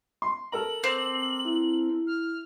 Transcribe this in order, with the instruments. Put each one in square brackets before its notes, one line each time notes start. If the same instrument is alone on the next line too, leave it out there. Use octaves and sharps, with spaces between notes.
[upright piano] C6
[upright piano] A4 A#4 A#5 [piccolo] F#7
[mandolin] C4 [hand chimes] D6
[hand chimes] E4
[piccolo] F6